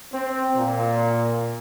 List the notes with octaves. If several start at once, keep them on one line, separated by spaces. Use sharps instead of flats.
C4
A#2